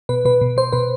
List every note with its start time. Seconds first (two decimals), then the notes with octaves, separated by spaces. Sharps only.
0.09 B2 B4
0.25 B2 B4
0.41 B2
0.57 B2 C5
0.72 B2 B4